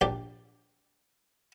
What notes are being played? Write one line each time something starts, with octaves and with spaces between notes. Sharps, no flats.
A#1 D4 G4 D5